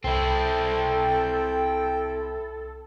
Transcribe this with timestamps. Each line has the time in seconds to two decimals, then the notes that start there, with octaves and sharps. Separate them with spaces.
0.04 C2 C4 E4 A4 G5